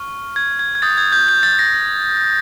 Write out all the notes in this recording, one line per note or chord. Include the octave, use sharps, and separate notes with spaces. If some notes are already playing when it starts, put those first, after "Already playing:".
Already playing: C#6 F6
G#6
G#6
G#6
D#6 G6 A6
G#6
G6
G6
A6
A#6